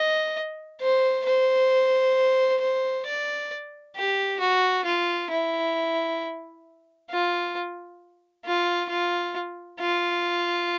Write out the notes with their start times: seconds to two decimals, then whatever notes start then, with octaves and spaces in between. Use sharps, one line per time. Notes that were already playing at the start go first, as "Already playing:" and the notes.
Already playing: D#5
0.81 C5
1.26 C5
2.61 C5
3.06 D5
3.96 G4
4.40 F#4
4.85 F4
5.31 E4
7.10 F4
8.45 F4
8.89 F4
9.80 F4